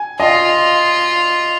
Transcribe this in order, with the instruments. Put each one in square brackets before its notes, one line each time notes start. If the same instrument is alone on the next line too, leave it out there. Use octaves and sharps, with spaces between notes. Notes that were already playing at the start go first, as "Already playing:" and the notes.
Already playing: [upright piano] G#5
[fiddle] F4 [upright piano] D#5